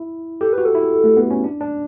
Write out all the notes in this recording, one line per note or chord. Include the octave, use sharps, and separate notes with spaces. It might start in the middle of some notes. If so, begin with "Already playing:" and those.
Already playing: E4
G4 A4
B4
F#4
A4
E4
A3
B3
C#4
D4
D4